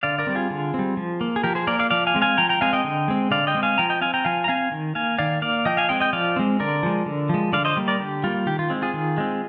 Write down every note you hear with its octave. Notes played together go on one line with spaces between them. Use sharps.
D3 D5 F5
A#4 D5
G3 C4
F4 G#4
D3
G3 C4
F3
A#3
G#4
F3 G4 A#4
G#4 C5
A#3 A#4 D5
D5 F5
F3 D5 F5
F5 G#5
G#3 C4
F5 G#5
F3 G5 A#5
G5 A#5
G#3 C4 F5 G#5
D#5 G5
D3
G#3 C4
D3 D5 F5
D#5 G5
G#3 C4
F5 G#5
F3 G5 A#5
D#5 G5
C4 F5 G#5
G5 A#5
F3 F5 G#5
A#5
C4 F5 G#5
D#3
A#3 F5 G#5
D#3 D5 F5
A#3 D5 F5
F3 D#5 G5
F5 G#5
G#3 C4 D#5 G5
D#5 G5
F3 D5 F5
G#3 C4
D3 A#4 D5
F3 G#3
D3
F3 G#3
D3 D5 F5
C5 D#5
G3 A#3
A#4 D5
D3 G4
G3 A#3 F4
D#3 G4
F4
G#3 C4
F4 G#4
D#3
G#3 C4